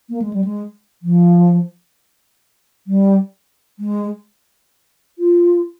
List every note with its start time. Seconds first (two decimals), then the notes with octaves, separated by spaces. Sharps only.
0.10 A#3
0.22 G#3
0.33 G3
0.44 G#3
1.02 F3
2.87 G3
3.79 G#3
5.19 F4